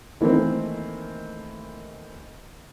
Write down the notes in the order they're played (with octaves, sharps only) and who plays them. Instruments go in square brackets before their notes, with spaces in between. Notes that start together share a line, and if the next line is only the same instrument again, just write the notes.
[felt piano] D#3 E3 A3 A#3 C4